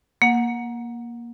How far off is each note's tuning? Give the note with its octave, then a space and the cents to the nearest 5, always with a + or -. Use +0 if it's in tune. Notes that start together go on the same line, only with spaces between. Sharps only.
A#3 +15 F#5 -20